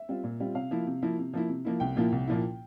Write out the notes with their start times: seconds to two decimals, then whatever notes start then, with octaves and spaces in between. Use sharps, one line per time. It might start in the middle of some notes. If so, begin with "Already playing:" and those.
Already playing: E5
0.09 G3 C4 F4
0.24 A#2
0.40 G3 C4 F4
0.55 C3 F5
0.71 F3 A#3 E4
0.87 C3
1.02 F3 A#3 E4
1.19 C3
1.33 F3 A#3 E4
1.49 C3
1.65 F3 A#3 E4
1.80 C2 G5
1.96 A#2 F3 A#3 E4
2.12 C2
2.27 A#2 F3 A#3 E4